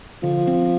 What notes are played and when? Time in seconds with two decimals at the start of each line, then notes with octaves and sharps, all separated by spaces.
0.23 D3 F3
0.47 C4